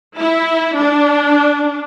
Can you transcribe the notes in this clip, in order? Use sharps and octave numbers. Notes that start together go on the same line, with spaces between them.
E4
D4